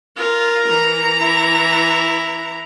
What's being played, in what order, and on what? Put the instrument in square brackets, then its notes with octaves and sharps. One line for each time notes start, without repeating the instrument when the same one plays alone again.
[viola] F4 [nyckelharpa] A#4
[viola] E3 A#5
[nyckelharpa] E4